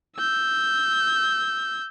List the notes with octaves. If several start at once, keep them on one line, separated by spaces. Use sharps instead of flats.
E6 G6